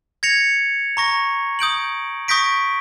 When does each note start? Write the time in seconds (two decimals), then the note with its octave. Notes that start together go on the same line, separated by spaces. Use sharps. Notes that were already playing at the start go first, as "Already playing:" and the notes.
0.23 G#6 A#6 C#7 F7
0.97 A#5 C#6 A#6
1.59 D#6 G6 D7 F#7
2.28 C#6 D#6 G6 A#6 B6 D7